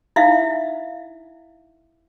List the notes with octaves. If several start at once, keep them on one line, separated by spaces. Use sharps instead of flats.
D#4 E4 E5 F5